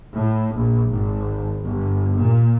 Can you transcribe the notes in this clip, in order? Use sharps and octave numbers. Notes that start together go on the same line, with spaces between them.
A2
A#1
G#1
G1
A#2